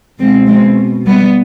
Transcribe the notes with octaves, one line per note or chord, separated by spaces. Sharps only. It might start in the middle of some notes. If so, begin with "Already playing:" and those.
B2 G#3 C4
G#3 C4
G3 B3